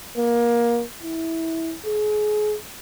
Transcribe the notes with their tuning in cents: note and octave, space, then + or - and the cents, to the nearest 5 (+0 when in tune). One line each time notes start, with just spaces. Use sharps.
A#3 +20
E4 -15
G#4 +30